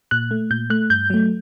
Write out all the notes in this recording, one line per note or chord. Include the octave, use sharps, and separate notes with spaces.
A#2 F#6
A3
A#2 G6
A3 F#6
G2 G6
F#3 A3